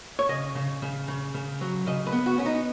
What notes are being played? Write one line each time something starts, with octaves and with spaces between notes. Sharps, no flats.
C#5
C#3 D#5
C#3
C#3
C#3
C#3
F#3
C#3 D#5
B4
B3
F#4
B3 C#4
D#4